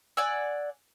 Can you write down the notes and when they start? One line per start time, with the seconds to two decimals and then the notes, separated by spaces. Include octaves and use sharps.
0.17 D5 F#5 G#5 E6